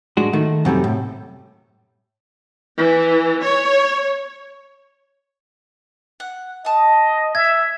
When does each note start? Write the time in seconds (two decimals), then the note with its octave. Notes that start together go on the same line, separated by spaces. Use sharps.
0.17 A2 G#3 D4 F#4
0.33 D#3 A3
0.65 F#2 C3 G3 A3
0.84 A2
2.78 E3
3.42 C#5
6.20 F#5
6.65 D#5 A5 D#6
7.35 E5 G#6